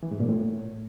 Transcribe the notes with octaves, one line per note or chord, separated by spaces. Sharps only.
E3
G#2
A#2
A2